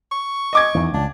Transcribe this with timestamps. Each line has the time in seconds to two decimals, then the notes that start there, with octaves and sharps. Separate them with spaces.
0.11 C#6
0.53 D#5 D6 G#6
0.75 E2 D#3
0.94 C#2 D4